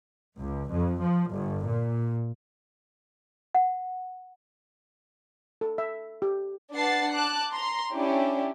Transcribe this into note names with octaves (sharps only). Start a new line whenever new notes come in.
C#2
F2
F3
G1
A#2
F#5
A4
E5
G4
D4 B4 F#5 A5 A6 C7
A5 D6 F#6
A#5 C6
C#4 D4 E4 G4